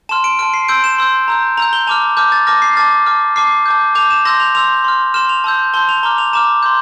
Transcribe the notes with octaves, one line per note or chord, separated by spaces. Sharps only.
A5 C6 F6 E7
D7
A5 C6 F6 D7
C7
C6 E6 G6 D7
E7
C6 E6 G6
A#5 E6 G6
A#5 E6 G6 F7
G7
A5 D6 F6 F7
A5 D6 F6 G6
A6
A5 D6 F6 A#6
C7
A5 D6 F6 A6
A5 D6 F6
A5 D6 F6 C7
A5 D6 G6
A5 D6 G6 F7
E7
C6 E6 G6 A#6
F7
C6 E6 G6 F7
C6 F6
C6 F6 E7
F7
A5 C6 E6 G6
A5 C6 E6 G6 G7
F7
A#5 D6 F6 G7
F7
A#5 D6 F6 E7
C6 G6